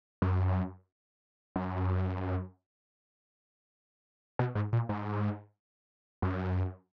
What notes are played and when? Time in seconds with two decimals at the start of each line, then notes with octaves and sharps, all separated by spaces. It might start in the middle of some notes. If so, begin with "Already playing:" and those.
0.22 F#2
1.56 F#2
4.39 B2
4.55 G#2
4.73 A#2
4.89 G#2
6.22 F#2